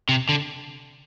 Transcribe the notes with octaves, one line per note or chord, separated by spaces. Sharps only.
C3
D3